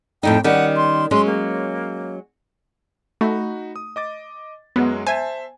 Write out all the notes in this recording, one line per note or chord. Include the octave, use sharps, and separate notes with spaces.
F2 A2 D#4 G5
D#3 G3 C#4 F#5
C6
F#3 G#3 C#4 C6
A#3
A3 D#4 F#4 B5
D#6
D#5 D6 A6
F#2 F#3 G#3 B3
C5 E5 G#5 A5